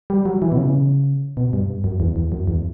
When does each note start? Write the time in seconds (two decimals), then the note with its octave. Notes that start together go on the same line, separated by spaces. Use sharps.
0.10 G3
0.26 F#3
0.42 E3
0.52 B2
0.58 C#3
1.37 B2
1.53 G2
1.84 F#2
2.00 E2
2.16 E2
2.32 F#2
2.47 E2